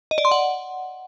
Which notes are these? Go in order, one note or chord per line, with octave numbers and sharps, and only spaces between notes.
D#5
D5
C6
F#5